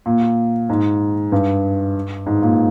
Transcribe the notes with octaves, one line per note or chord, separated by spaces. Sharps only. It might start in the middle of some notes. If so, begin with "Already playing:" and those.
A#2
G#2
G2
G#2
A#2